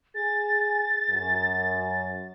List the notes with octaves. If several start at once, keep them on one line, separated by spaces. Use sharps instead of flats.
G#4 A6
F#2